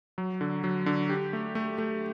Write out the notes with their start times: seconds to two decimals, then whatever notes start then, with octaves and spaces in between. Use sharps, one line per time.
0.18 F#3
0.41 D3
0.64 F#3
0.86 D3
1.09 G4
1.33 A3
1.55 A3
1.78 A3